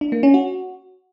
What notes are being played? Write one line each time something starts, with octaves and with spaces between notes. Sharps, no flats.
D4
A#3
C#4
F#4